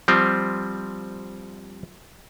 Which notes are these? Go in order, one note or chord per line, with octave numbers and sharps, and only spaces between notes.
F3 G3 C4